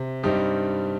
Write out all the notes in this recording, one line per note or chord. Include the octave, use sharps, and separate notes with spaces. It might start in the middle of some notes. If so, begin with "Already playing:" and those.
Already playing: C3
G2 G3 C4 D#4 G4